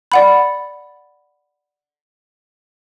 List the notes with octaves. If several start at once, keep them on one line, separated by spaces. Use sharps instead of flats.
D5 F#5 B5